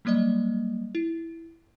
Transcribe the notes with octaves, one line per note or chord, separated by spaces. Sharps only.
F#3 G3 A#3 D5 D#5
E4